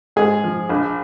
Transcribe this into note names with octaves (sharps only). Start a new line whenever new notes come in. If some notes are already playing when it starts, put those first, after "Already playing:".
G#2 G#4
F3
A#1